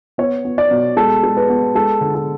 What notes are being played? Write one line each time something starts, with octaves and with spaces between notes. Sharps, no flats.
B3 C#5
B3
D5
B2
G#3 A4
G#3
B4
B3
G#3 A4
D3
A4